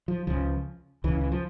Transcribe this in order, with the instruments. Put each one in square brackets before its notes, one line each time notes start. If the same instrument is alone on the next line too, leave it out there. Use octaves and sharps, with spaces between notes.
[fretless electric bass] F3
C#2 C#3 F3
C#2 C#3 E3
E3
F3